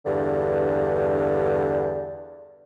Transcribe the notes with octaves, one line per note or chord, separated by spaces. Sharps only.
E2 G2 D3